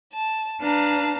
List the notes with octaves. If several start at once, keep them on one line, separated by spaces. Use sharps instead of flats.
A5
D4 B4 F5 A5 A#5